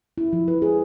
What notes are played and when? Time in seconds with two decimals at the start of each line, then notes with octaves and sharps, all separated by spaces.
0.18 E4
0.33 F3
0.48 B4
0.62 G#4